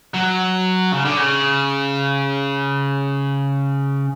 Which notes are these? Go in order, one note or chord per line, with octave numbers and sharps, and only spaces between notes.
F#3
C#3
D3
C#3